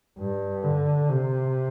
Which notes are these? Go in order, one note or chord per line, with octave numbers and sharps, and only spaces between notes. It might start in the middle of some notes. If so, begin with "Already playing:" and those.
G2
D3
C3